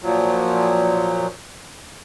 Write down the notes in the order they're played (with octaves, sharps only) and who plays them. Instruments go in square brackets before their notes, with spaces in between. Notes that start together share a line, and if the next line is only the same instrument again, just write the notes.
[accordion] A#2 F3 F#3